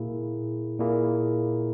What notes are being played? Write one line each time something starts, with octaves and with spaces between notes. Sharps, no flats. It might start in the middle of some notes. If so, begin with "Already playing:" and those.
Already playing: A#2 A#3 E4 G#4
A#2 A#3 E4 G#4